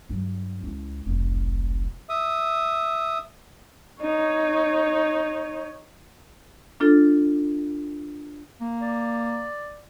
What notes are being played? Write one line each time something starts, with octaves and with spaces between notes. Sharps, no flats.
G2 F#3
C#2 E4
F1 B1
E5 D#6
D#4 C#5
D4 F4 A4
A#3
D5